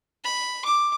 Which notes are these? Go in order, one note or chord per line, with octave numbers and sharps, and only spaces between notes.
B5
D6